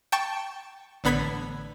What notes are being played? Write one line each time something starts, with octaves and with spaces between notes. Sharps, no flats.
G5 A5 C#6
A1 D3 B3 B5 G#6 B6